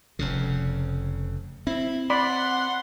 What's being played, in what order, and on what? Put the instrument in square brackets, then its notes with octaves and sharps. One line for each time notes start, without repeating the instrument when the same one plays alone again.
[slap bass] F1 F2 C#3
[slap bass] C4 [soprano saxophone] E4
[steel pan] D5 B5 [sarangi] F#5 [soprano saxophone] C6